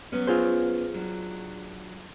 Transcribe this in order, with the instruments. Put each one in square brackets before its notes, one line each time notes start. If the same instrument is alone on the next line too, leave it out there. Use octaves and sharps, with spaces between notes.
[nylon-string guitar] F#3 B3 C#4
[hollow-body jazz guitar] F4 G#4 C5
[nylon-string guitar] F#3 D4